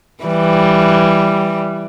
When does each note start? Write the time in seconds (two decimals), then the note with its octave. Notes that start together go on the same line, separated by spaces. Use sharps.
0.24 E3 G3